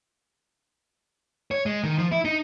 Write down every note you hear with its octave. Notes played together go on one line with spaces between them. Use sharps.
C#5
G#3
D#3
F3
E4
D#4